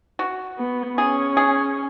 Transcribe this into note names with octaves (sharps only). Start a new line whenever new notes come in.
F#4
B3
C#4 G#4
G#4